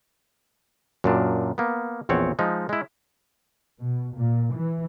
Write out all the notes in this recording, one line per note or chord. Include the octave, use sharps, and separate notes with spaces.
F#2 A#2 D4
A#3 B3
A#1 E2 C4 C#5 F#5
F3 G#3 D#4
G#3 E4
B2
A#2
E3